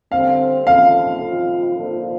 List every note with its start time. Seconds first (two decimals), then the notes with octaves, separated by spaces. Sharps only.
0.12 D3 G3 C4 F5
0.67 F3 C4 F4 A4 F5
1.22 F3 C4 F4
1.76 F3 A#3 D4 A4 C5